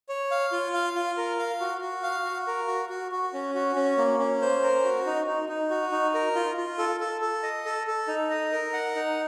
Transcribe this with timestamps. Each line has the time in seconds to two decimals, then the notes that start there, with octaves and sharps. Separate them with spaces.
0.09 C#5
0.31 F5
0.52 F4
0.74 F5
0.95 F4
1.17 A#4
1.39 F5
1.60 F#4
1.81 F#4
2.03 F5
2.25 F#4
2.47 A#4
2.68 F#4
2.89 F#4
3.12 F#4
3.33 C#4
3.55 F#4
3.76 C#4
3.98 A#3
4.19 C#4
4.41 C5
4.63 A#4
4.84 F#4
5.06 D#4
5.27 D#4
5.49 D#4
5.71 F#4
5.92 D#4
6.14 A#4
6.35 F4
6.57 F4
6.79 A4
7.00 A4
7.21 A4
7.43 D#5
7.66 A4
7.87 A4
8.08 D#4
8.30 D#5
8.52 A#4
8.73 F#5
8.95 D#4